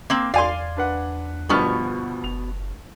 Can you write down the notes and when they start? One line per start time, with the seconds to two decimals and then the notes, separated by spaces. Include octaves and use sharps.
0.10 A#3 C4
0.34 E2 D5 F5 G#5 C6
0.77 D4 B4 F#5
1.49 D2 G2 B2 F3 B3 C#6 F6
2.24 F#1 F7